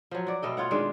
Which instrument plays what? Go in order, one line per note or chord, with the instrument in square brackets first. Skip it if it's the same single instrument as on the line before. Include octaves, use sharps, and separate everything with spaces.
[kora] F3 F#3
F#4 D5
B2 A3 D#5 G5
F4 C#5 F#5
D#3 G#3 D4